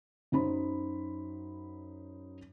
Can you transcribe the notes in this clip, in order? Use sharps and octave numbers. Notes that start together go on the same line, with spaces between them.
F#2 F#3 D#4 C5 B5